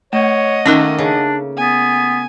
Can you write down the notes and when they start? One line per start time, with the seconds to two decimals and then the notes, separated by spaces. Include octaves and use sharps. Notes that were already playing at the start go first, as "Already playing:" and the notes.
0.13 A3 C#5 D#5 F#5
0.66 D#3 A3 A#3 C#4 D#4 A#4
0.98 C#3 D4
1.57 B3 G#5